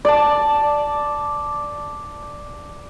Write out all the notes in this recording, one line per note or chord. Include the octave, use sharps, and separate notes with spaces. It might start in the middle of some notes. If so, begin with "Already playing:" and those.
D5 A5